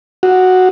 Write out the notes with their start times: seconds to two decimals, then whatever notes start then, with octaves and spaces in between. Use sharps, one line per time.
0.23 F#4